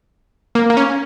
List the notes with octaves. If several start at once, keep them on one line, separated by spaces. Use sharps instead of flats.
A#3
A#3
C#4